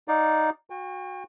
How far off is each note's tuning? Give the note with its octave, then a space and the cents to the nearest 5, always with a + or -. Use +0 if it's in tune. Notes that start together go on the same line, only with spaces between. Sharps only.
D#4 +0 D5 +0 F5 +35
F#4 -15 G5 +40